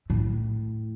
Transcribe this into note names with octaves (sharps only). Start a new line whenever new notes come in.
A2